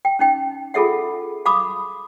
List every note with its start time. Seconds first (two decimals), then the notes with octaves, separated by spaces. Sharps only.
0.05 G5
0.19 C#4 D#4 G5
0.74 F4 G#4 A4 E5 F#5
1.46 F5 B5 D6 D#6